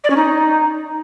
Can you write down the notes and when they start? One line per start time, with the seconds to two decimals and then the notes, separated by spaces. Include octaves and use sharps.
0.04 D5
0.10 C#4
0.16 D#4